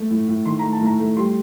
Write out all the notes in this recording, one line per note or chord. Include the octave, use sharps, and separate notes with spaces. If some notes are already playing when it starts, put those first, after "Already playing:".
Already playing: A3
A2
A2
D#3 C6
A3 A#5
A5
A2 A#5
A3
G3 C6